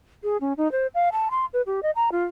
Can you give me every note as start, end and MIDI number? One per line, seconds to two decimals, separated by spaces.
0.24 0.37 68
0.41 0.53 61
0.57 0.71 63
0.72 0.87 72
0.95 1.09 77
1.12 1.28 81
1.31 1.45 84
1.53 1.62 71
1.66 1.80 67
1.83 1.91 75
1.96 2.09 82
2.12 2.24 65